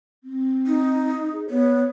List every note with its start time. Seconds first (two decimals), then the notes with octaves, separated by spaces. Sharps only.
0.24 C4
0.67 D#4
1.34 G#4
1.50 B3 C#5